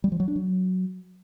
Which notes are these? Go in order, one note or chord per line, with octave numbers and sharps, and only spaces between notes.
G3
F3
F#3
D4
F#3